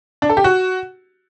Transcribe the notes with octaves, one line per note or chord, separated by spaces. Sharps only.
D4
A4
G4
F#4